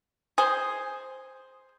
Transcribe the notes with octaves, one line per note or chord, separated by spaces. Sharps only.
G#4 C5